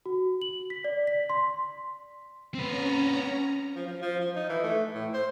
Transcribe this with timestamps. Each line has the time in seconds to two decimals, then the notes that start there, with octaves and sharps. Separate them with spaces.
0.06 F#4
0.42 F#7
0.70 B6
0.84 D5
1.07 B6
1.30 C6
2.55 C4 C#4 B4 A#5
3.75 F3
3.87 F3
4.02 F3
4.21 F3
4.36 D#4
4.50 E3
4.64 A3
4.95 A2
5.14 C5